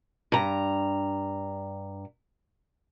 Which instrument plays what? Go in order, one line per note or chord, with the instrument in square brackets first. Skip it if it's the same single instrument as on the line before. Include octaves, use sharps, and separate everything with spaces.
[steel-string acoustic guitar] G2 A#5